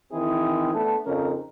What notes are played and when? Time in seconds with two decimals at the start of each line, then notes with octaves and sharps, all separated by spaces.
0.12 D#3 E3 C4 E4 G#4
0.73 A3 B3 D4
1.06 F2 C#3 C#4 D#4 A#4